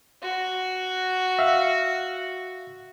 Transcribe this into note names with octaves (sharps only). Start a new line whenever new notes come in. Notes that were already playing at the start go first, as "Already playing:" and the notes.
F#4
E5 F5